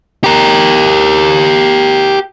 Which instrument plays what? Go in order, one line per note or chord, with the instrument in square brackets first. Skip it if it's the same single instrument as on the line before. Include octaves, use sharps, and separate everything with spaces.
[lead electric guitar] G4 A#4